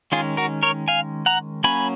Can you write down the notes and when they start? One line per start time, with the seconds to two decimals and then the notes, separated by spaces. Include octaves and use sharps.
0.12 D#3 G#3 C#4 F4 G#4
0.37 F#4 A#4
0.63 A#4 C#5
0.88 F5 G#5
1.26 F#5 A#5
1.64 F#3 A#3 C#4 G#5 B5